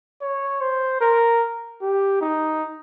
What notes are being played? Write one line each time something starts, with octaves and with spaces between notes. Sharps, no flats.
C#5
C5
A#4
G4
D#4